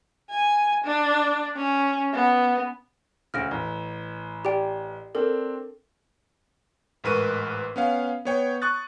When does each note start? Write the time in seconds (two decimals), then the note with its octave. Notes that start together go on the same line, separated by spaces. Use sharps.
0.30 G#5
0.85 D4
1.56 C#4
2.13 B3
3.34 D2 C#3 F6 A#6 D7
3.51 A1
4.45 G4 D5 G5
5.15 C4 D4 A4 A#4
7.04 A1 G#2 A#4 B4 C#6 D#7
7.76 B3 C#4 F5
8.25 B3 C#5 G5
8.62 C#6 D#6 F#6 A6